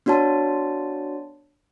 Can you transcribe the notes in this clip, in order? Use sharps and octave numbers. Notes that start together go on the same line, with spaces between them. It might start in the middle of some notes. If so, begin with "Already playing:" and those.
B3 D4 F#4 C#5 A5